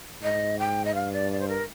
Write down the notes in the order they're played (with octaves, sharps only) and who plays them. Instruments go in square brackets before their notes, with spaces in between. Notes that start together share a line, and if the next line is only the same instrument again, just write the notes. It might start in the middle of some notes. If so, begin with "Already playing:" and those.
[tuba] G#2 [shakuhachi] D#5
[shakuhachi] G5
D#5
[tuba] G2 [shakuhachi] F5
[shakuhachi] D5
D5
C5
A#4